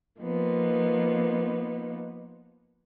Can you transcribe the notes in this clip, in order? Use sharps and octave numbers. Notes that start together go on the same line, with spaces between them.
F3 A#3 B3 D#4